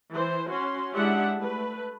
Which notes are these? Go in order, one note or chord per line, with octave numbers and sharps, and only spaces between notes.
E3 C5
C#4 F#4 C6
G#3 D4 E4 G4 E5 F#5
A3 B4